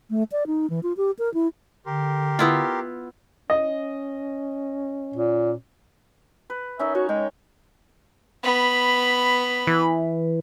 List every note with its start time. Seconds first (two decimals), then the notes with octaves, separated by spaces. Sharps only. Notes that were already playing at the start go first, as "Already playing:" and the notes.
0.10 A3
0.32 D5
0.47 D#4
0.70 E3
0.83 F4
0.97 G4
1.19 A#4
1.34 E4
1.86 D3 G4 A#4 C6
2.39 B3 E4 F4
3.50 C#4 D#5
5.14 A#2
6.50 B4
6.79 C#4 D#4 A#4 E5
6.95 F#4 C#5
7.09 G#3 G5
8.44 B3 B5
9.67 E3